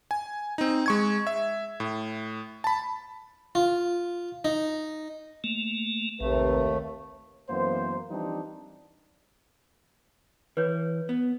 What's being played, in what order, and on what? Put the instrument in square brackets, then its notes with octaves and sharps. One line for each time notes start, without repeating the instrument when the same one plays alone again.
[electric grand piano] G#5
C4 D#4
G#3 C#6 G#6
E5
A2
A5 B5
[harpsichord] F4
D#4
[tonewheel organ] A3 A#3
[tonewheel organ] A#1 [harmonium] D#2 A3 [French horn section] C3 B4
[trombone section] F#2 E3 A#3 B3 C5
E3 F3 G3 C4 D4 D#4
[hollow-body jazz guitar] E3 [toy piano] B4 C#5
[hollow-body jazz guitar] B3